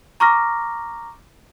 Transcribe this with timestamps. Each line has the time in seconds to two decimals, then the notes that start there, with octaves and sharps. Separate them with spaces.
0.20 A#5 C#6 D6 F6 A#6